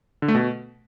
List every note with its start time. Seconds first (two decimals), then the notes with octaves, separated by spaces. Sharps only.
0.22 D3
0.28 A3
0.35 B2